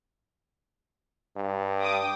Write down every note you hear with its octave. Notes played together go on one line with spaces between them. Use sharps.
G2
G5 D6 D#6